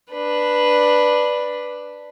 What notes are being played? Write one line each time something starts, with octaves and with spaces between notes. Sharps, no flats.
D4 B4